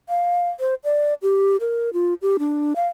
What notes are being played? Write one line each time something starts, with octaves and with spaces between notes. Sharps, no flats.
F5
C5
D5
G4
A#4
F4
G4
D4
F5